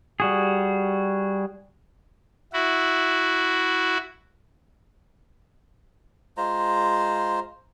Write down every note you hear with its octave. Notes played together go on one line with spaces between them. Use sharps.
G3 F#4 G#4
E4 F#4
G#3 F4 C5 A#5